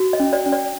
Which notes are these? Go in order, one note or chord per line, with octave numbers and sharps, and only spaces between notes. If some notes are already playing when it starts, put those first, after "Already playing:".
Already playing: F#4
D#5
C#4
D5
C#4
D5